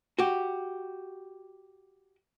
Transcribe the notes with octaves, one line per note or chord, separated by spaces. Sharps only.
F#4 G4